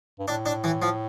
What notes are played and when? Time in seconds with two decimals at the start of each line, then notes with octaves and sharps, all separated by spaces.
0.19 G2
0.28 A2 D4
0.46 D4
0.64 E3
0.82 F3